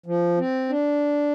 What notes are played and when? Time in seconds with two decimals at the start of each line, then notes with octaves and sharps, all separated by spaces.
0.06 F3
0.38 C4
0.69 D4